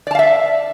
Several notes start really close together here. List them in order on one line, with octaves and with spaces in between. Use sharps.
D5 A5 F5 E5